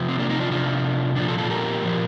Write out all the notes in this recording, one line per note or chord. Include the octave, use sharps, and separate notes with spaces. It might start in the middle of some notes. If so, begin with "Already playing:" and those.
Already playing: C3 F3
C4
A#3 D4
C4 D#4
D4 F4
C3 F3 D4 F4
A#2 F3 D4 F4
F4 A4
F4 A4
G4 A#4
A#2 F3